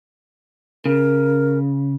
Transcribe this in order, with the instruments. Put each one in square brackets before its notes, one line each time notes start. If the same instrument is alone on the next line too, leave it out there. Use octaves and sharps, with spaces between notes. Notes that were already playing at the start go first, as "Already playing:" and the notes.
[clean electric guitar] C#3 [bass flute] A#4